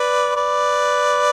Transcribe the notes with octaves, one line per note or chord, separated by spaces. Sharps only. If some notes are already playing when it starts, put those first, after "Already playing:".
Already playing: B4 D5
B4 D5